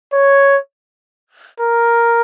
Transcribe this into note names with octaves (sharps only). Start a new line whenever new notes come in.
C#5
A#4